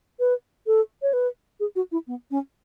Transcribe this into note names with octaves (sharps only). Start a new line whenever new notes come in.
B4
A4
C#5
B4
G#4
F#4
E4
B3
C#4